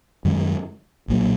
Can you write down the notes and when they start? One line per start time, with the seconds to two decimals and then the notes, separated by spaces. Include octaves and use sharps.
0.25 F#2 D#3 G#3
1.08 B1 A#2 F#3